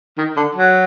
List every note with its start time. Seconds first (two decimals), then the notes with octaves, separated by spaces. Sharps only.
0.17 D#3
0.36 D3
0.55 F#3